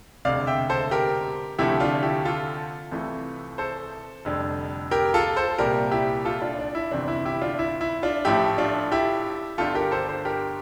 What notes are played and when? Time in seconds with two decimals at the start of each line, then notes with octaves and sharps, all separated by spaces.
0.25 E1 D2 C3 D5 F5
0.47 E5 G5
0.69 A4 C5
0.91 G4 A#4
1.58 D2 C3 F3 A3 E4 G4
1.80 D4 F4
2.03 E4 G4
2.25 F4 A4
2.91 C2 C3 E3 A3
3.58 A4 C5
4.25 F1 F2 D3 G3
4.91 G4 A#4
5.14 F4 A4
5.36 A4 C5
5.58 C2 A#2 G3 G4 A#4
5.91 E4 G4
6.25 F4 A4
6.42 D4 F4
6.59 D4
6.75 E4
6.92 G1 F2 C3 E3 D4
7.08 E4
7.25 E4 G4
7.41 D4 F4
7.59 E4
7.81 E4
8.03 D4 F4
8.25 A1 A2 F3 A3 E4 G4
8.58 D4 F4
8.92 E4 G4
9.58 G1 G2 D3 G3 F4 A4
9.75 G4 A#4
9.91 A4 C5
10.08 A4 C5
10.25 G4 A#4